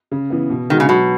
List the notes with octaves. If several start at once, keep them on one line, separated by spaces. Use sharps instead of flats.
C#3
E3 B3
B2
D#3 G#3 D#4 F#4
C#3
B2 F#3